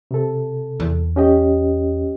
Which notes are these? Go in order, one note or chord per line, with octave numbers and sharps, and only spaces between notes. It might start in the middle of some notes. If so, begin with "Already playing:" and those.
C3 A4
E2
C#4 G4 D#5